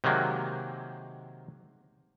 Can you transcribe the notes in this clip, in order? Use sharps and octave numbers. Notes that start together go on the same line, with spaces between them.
C3 D#3 F#3 G#3 A#3